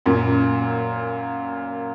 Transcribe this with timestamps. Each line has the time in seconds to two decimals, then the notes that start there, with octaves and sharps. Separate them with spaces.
0.06 F#2 A#2